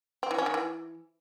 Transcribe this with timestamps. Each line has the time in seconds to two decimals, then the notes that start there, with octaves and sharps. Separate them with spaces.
0.23 C4
0.31 E3
0.38 C#4
0.46 D#3
0.54 E3